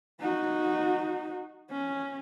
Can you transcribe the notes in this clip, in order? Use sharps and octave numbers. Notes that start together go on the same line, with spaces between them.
D#4 F#4
C#4